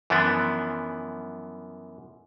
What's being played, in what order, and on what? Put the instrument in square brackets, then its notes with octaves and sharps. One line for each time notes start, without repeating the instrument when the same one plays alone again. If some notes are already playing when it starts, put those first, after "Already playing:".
[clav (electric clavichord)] F#2 E3 F3 B3 D4